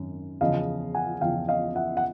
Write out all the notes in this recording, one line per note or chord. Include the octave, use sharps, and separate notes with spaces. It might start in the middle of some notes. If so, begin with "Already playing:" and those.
Already playing: G#1 F#2 D#3
E2 C#3 F3 D#5 F5
F#5 G#5
E2 C#3 F3 F5 G5
D#5 F5
E5 F#5
F#5